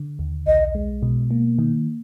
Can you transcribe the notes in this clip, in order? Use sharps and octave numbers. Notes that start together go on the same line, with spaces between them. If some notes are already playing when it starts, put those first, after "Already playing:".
Already playing: D3
D#2
B1 D#5
G#3
B2
A#3
D#3